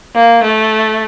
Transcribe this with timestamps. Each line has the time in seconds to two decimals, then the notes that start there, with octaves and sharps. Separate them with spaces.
0.15 A#3
0.43 A3